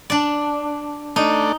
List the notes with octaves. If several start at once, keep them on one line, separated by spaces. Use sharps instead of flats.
D4 D5
A3 D4 D#4